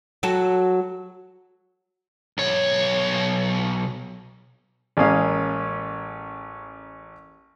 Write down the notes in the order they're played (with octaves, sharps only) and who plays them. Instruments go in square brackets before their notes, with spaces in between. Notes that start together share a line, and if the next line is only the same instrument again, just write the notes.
[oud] F#3 F#4 A4
[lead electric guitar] B1 C#5
[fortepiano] A1 G#3 A#3 C#4 F5 D#6